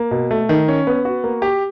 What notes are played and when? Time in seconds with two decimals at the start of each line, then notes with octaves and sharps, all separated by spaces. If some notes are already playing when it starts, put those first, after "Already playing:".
Already playing: A#3
0.11 B2
0.31 A3
0.49 D#3
0.68 C#4
0.87 B3
1.05 F#4
1.24 A#3
1.42 G4